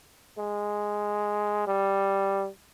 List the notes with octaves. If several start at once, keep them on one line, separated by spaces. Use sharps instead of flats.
G#3
G3